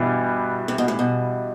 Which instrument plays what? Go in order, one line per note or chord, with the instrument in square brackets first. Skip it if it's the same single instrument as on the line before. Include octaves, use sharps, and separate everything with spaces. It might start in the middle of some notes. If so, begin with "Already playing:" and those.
Already playing: [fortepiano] G2 E3 G3 B3 E4 [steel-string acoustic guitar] B2
[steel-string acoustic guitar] C3
B2
A2
B2